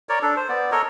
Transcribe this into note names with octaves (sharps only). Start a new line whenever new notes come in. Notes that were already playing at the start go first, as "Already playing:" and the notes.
A#4 C#5 D5
D4 A4
C5
B3 D5
A4 A#4 C#5 D#5